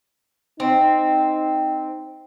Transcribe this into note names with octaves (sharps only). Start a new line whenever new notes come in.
C4 D#4